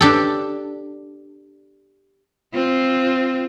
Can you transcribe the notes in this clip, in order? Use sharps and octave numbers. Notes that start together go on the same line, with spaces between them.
D4 G4 A4
C4 F4